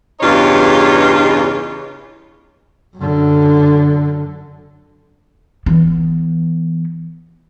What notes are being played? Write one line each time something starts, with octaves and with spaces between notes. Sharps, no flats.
E2 G2 C#3 D#4 F4 C#5
F#2 D3
E3 B3